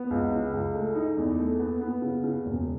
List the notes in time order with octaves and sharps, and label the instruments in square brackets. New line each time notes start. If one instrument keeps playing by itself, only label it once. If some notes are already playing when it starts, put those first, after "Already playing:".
Already playing: [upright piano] B3
C#2
C#3
C#2
A3
D#4
E2
A3
B3
B3
C#3
C#3
E1